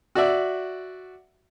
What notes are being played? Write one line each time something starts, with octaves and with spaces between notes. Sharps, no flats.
F#4 D5 E5